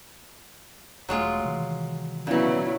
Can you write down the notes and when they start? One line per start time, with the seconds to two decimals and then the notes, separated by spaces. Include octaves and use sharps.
1.09 E1 F#3 G#3 A3 F4
1.44 C3 D#3 E3
2.27 A#2 C#3 F#3 B3 C#4 E4